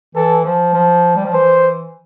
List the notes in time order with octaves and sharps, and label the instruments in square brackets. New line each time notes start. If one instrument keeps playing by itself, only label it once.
[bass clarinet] E3 [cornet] A4
[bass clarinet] F3
F3
G3
F3
[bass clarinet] E3 [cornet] C5